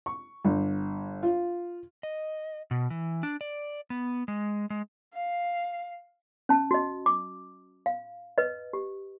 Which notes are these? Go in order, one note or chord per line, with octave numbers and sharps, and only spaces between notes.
C#6
G1
F4
D#5
B2
E3
D4
D5
B3
G#3
G#3
F5
C#4 A5
F#4 D#5
D6
F5
B4 D#5
G4